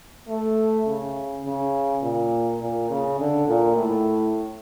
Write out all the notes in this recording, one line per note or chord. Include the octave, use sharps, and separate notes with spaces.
A3
C#3
C#3
A#2
A#2
C#3
D3
A#2
A2